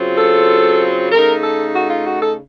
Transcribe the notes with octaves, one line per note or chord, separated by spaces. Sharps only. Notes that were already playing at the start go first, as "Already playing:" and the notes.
Already playing: C#3 F#3 C4 F4
A4
C#3 A3 D#4 A#4
A4
F#4
F4
F#4
A4